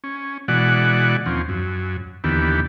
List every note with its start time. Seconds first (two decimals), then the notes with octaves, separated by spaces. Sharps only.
0.04 C#4
0.48 B2 E3 G#3 F#4 D5 F#5
1.26 D#2 F3 C4 C#4
1.49 F#2
2.24 D#2 D3 E3 B3 G4